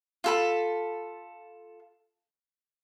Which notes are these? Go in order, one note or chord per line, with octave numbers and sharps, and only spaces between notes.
F4 A4 B5